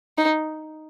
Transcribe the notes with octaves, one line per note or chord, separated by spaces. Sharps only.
D#4